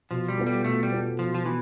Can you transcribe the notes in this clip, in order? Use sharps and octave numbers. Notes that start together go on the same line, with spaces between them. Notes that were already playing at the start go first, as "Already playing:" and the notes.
B2 F3
G3
B3 F4 A4
G3
B2 A3
G3
B3 F4 A4
B2 F3
F3
E3 B3